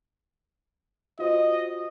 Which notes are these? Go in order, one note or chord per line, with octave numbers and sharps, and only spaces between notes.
F4 F#4 C5 D#5